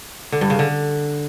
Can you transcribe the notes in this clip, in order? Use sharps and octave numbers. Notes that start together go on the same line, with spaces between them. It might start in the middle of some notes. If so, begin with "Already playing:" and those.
D3
G2
C#3
D3